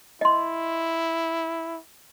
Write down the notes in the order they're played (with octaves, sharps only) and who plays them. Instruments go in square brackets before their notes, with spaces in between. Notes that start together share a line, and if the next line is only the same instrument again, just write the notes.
[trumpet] E4 [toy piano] D#5 C6